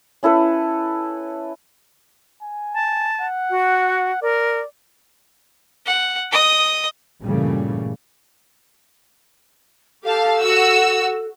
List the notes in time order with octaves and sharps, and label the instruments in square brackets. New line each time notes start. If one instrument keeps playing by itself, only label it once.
[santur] C#4 E4 A4 B4
[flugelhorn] G#5
[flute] A5
[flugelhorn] F#5
[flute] F#4
[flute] A#4 [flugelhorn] D5
[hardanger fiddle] F#5
D#5 D#6
[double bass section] G2 A#2 C#3 E3 G3 A3
[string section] G4 F5 A5 [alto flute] A4
[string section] F#4 E6